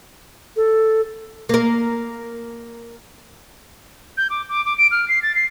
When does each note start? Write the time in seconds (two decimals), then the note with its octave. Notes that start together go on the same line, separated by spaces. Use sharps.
0.56 A4
1.49 A#3 A#4
4.17 G6
4.30 D6
4.49 D6
4.65 D6
4.78 D7
4.91 F6
5.08 C7
5.22 A6
5.35 C7